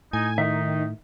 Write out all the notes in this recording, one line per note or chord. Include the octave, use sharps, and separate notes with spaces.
A2 D#4 G#5
D#3 D#4 E5